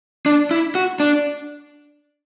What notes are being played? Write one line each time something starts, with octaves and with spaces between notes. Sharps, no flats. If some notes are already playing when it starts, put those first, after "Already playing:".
D4
E4
F#4
D4